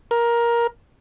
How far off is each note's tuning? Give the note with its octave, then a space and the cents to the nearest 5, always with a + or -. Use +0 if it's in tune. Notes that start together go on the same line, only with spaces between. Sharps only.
A#4 +15